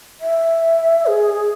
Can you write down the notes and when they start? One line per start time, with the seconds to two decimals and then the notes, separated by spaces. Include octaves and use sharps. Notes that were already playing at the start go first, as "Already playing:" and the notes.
0.21 E5
1.07 G#4